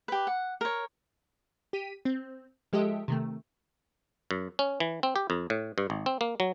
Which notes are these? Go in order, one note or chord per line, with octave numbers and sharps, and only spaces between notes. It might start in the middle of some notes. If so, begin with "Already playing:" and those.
G4 B4
F#5
A#4 C#5
G4 B6 D#7
C4
F3 G#3 G4 A4 D#5 E5
C3 D#3 A3
F#2
C#4
E3
C4
G4
F2
A2
G2
G#1
C4
A#3
F#3